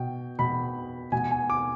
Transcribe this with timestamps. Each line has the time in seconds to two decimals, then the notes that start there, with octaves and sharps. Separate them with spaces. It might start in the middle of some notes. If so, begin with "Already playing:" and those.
Already playing: B2 G5
0.39 B2 B5
1.12 B2 G#5
1.31 G#5
1.50 D6